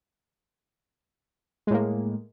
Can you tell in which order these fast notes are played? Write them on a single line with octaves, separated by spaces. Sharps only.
G#3 A2 A#3